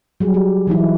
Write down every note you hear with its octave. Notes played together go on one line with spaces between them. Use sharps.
F#3 G3 G#4
G4
E3 F#3 D#4 E4